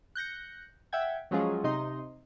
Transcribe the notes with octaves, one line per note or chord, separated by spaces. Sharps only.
F#6 G6 A#6 C#7
E5 F#5 G5 G#6
F3 F#3 G#3 C#4 F4 G#4
C3 D#4 D#5 C6